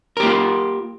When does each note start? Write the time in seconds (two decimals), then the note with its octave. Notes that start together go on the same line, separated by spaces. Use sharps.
0.17 A#4
0.20 G4
0.23 A#3
0.26 F4